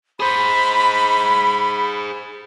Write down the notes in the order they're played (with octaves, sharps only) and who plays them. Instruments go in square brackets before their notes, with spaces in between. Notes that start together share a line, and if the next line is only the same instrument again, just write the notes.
[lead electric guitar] G#4 C5 [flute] B5